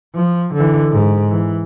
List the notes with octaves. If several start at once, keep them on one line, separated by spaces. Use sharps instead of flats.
F3
D3 E3
G#2
E3